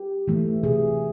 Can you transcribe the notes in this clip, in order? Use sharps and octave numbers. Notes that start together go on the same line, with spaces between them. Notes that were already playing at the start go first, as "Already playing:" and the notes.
Already playing: G4
E3 A3
C3 G#4